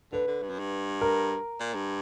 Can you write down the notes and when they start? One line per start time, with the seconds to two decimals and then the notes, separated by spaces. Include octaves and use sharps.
0.12 D3 B4
0.27 D3
0.43 G2
0.50 F#2
0.59 G2
1.01 A#4
1.60 A#2
1.75 G2